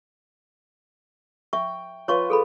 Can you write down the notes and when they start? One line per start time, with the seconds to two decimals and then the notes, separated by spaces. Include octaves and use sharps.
1.53 E5 G5 C#6
2.08 F4 B4 C#5 C#6
2.30 G#4 A4 B5